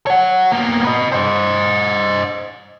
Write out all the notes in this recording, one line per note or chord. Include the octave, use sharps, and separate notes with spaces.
C#5 F#5
A#3 B3
B4 D#5
C5 D#5